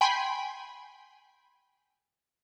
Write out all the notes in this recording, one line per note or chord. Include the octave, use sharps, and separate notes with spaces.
G5 G#5 B5 C6